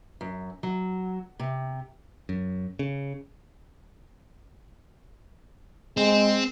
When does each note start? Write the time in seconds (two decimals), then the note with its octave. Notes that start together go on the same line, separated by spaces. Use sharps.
0.21 F#2
0.63 F#3
1.39 C3
2.29 F#2
2.79 C#3
5.97 G#3 C4